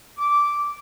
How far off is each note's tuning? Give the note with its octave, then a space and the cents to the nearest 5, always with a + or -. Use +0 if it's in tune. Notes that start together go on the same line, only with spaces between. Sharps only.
D6 -10